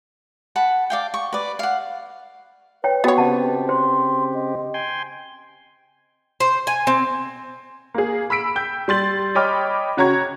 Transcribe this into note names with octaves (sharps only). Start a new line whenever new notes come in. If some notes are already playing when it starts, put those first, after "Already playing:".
F#5 A5 B5
D5 F5 G5
C#6
B4 D5
F5 F#5
B4 C#5 G5
B3 F#4 C#5 G5
C#3 C4 G4 D#5 F#5 A5
C5 C6
D#5
G5 G#5 C6
C5
G#5
C4
A#3 G#4
B5 E6 B6 D7
G5 G6
G3 C6 A6 F#7
C#5 D#5 G5 B5 D6 F6
C#3 F#4 C#5 A#5 C#6 G#6